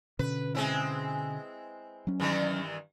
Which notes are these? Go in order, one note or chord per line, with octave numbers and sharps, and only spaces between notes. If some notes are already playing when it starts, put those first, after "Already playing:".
B2 D3 C#4 B4
G#3 C4 E4
F#3 C#4
G2 D#3 E3